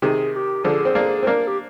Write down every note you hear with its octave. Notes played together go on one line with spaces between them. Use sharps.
C3 D#3 G#4
G#4
G4
D3 F3 G#4
C4
A#3 D4
C4
A#3 D4 A#4
G4